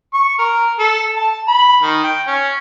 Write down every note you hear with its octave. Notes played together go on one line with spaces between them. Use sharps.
C#6
A#4
A4
A5
B5
D#3
G5
C#4